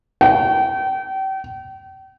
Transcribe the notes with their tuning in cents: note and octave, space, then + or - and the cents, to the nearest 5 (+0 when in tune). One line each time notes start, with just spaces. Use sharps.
G5 -35